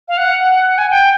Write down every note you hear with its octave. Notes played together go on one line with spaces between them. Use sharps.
F5
F#5
G#5
G5